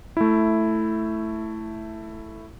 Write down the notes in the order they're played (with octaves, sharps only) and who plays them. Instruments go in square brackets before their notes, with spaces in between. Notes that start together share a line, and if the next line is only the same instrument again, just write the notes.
[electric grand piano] A3 E4